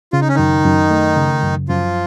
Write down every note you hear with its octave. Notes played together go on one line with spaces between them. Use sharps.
C#3 F4
D#4
C#4
F#2 D#3 D#4
F#2
A3
C#3
F#2
F#2 F3 F4